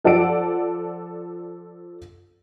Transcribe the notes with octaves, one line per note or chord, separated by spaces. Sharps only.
F3 A4 D5 F#5 D7